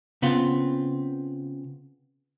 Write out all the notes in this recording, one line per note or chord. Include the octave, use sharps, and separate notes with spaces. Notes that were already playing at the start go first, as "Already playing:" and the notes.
C#3 B3 C4 F4